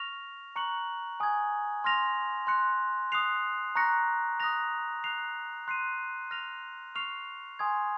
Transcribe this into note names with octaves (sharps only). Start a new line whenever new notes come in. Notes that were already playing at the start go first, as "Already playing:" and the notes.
Already playing: C#6 F6 A#6 F7
A#5 C#6 F#6 C#7 F#7
G#5 D#6 G#6
C6 F6 A#6 F7
C6 F#6 C#7
D#6 F#6 C7 F7
A#5 C#6 F#6 A#6 C#7
D#6 F#6 A#6 F7
F#6 C7 F7
C6 F#6 C7 D#7
F6 A#6 F7
C#6 F6 C7 F7
G#5 C6 D#6 G#6